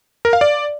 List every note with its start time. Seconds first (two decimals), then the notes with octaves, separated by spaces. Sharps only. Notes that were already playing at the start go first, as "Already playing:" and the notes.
0.25 A#4
0.33 F5
0.41 D5